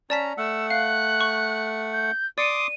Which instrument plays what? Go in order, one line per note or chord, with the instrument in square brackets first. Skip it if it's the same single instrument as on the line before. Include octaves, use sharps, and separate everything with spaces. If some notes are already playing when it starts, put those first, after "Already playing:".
[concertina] C#4 A#5 [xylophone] D5 A5 B6
[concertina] A3 F#5 [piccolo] E6
[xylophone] F5 [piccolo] F#6
[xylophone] C#6
[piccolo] G6
[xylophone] D5 C#7 [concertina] C6 D6 D#6 [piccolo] D#7